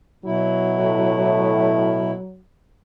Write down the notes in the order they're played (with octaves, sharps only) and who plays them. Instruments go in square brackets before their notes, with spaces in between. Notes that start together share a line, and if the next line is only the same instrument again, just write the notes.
[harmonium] B2 E4 [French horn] F#3
[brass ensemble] A2